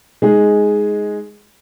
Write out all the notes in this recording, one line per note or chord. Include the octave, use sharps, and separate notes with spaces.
G#3 D#4 G#4